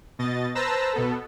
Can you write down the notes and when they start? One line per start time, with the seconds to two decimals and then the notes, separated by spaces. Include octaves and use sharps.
0.19 B2 D#5 A6
0.55 B4 C5 A5 A#5 E6 A#6
0.93 B2 B3 A4